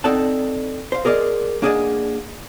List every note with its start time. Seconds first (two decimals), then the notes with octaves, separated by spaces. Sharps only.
0.04 C4 D#4 A4 D5 F#5 A5
0.92 C5 F5
1.05 G#4 A#4 D5 D#5
1.62 A#3 D4 G#4 D5 D#5 F#5